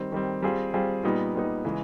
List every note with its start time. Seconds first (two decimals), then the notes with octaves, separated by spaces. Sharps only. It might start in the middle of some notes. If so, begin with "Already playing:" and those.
Already playing: D#3 G3 C4
0.12 D#3 G3 C4
0.42 G3 C4 F4 G#4
0.74 G3 C4 F4 G#4
1.03 A#2 G3 B3 D#4
1.34 A#2 G3 B3 D#4
1.65 C#3 E3 G#3